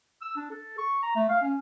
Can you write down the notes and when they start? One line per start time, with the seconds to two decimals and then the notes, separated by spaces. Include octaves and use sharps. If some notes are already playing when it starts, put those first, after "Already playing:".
0.22 E6
0.36 D4
0.51 A4
0.78 C#6
1.03 A#5
1.16 A3
1.29 F5
1.42 C#4